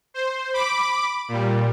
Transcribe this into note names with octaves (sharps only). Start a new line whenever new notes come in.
C5
B5 D6
A#2 G3